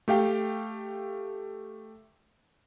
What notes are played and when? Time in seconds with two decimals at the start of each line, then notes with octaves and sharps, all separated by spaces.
0.08 A3 G4 F5 G5